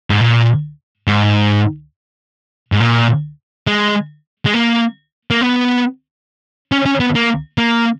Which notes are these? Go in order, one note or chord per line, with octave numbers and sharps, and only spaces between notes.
G#2
A#2
G#2
G#2
A#2
G#3
G#3
A#3
A#3
B3
C#4
C#4
B3
A#3
A#3